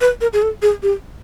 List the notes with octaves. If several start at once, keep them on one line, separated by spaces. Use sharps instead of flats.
B4
A#4
G#4
A4
G#4
G4